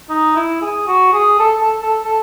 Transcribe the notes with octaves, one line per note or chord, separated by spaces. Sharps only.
D#4
E4
G#4
F#4
G#4
A4
A4
A4
A4